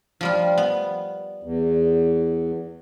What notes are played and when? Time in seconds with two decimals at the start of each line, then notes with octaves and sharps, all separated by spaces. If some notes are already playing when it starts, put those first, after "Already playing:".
0.21 F3 G3 F4
0.58 B3
1.43 E2